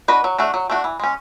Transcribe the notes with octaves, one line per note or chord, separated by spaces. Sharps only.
D4 F#4 B4 D#5
F#3
A3 D4 F#4
F#3
A3 D4 F#4
E3
G#3 C#4